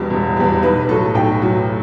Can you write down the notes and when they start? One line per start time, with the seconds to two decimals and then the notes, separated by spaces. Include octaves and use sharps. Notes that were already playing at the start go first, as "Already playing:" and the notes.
Already playing: E1 E2 B2 G3
0.10 E1
0.36 E2 B2 G3
0.62 B1 B4
0.88 A2 F#3 A4
1.15 B1 G5
1.41 A2 F#3